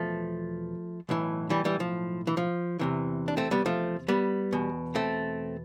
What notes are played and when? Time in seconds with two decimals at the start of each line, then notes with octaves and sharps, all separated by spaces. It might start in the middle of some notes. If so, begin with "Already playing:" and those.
Already playing: E2 B2 F3 A3
1.09 B1 A2 E3
1.50 E3 G3
1.65 E3 G3
1.80 F3
2.27 E3
2.37 F3
2.79 E2 C3 E3
3.28 D4
3.37 A3 C4
3.51 G3 B3
3.66 F3 A3
4.08 G3 B3
4.52 E2 B2
4.95 A3 C4